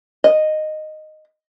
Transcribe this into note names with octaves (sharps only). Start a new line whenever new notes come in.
D#5